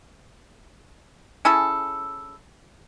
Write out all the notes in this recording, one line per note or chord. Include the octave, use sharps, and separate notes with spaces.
C#4 E4 G#4 A4